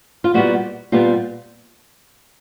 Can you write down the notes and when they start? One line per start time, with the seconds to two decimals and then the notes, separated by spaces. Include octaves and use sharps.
0.24 F4
0.34 A#2 G3 B3 E4 F#4
0.92 A#2 G3 B3 F4 G4